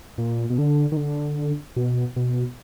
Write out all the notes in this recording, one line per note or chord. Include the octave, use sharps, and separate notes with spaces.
A#2
B2
D3
D#3
D3
B2
B2